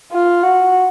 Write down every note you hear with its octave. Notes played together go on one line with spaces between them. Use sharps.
F4
F#4